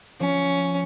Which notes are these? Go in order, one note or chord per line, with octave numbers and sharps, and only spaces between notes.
F3 C#4